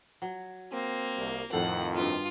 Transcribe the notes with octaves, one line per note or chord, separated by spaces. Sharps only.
F#3
A#3 C4
C2
F2 A2 D#3 A4 F5 F#5
G2 F4 F#4 E5